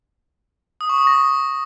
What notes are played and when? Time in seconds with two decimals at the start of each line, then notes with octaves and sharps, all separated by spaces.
0.81 D#6
0.89 C#6
0.98 D#6
1.07 A#6